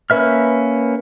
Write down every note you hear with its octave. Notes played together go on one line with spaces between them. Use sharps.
A#3 C#4 B4 E5 F6